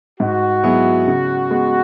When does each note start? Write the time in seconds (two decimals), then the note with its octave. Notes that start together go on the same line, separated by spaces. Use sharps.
0.20 G#2 F#4
0.64 F#3 B3 E4 G#4
1.07 C#3
1.50 G#3 B3